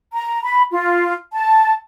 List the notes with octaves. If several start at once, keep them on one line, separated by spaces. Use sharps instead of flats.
A#5
B5
F4
A5